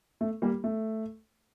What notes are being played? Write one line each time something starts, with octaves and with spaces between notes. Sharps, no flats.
A3
G3 A#3
A3